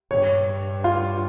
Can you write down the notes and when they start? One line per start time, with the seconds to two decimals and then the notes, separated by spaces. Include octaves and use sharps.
0.11 G2 C#5
0.84 F4